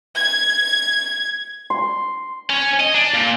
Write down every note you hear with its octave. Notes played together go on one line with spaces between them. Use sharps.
G#6
C6
C#4
D#5
D4
A#2